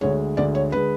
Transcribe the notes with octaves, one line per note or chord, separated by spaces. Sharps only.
D2 D3 G#3 C#5
D2 D3 G#3 D5
C#5
D3 G#3 B4